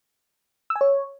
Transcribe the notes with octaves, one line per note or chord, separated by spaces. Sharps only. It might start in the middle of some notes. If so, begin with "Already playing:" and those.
E6
G#5
C#5